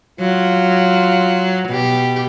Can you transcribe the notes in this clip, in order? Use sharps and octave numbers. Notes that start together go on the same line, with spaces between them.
F#3 F4
B2 G4